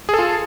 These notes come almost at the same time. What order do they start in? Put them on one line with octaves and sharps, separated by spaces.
G#4 A4 F4